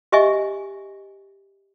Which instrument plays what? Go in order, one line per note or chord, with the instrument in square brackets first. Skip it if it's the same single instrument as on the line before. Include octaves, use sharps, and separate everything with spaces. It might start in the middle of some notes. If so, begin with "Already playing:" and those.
[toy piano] G4 D#5 E5 G#5 C#6